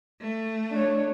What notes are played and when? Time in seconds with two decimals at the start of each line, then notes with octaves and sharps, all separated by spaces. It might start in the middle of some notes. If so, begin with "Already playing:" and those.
0.20 A3
0.71 D4 C#5